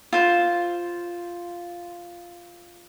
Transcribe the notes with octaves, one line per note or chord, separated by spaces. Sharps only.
F4 C5